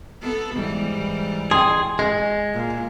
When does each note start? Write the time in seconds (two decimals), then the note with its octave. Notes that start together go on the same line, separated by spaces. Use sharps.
0.22 B3 A4
0.53 G#2 E3 G3
1.51 G#4 G5 C6
1.99 G#3 G#5
2.53 A#2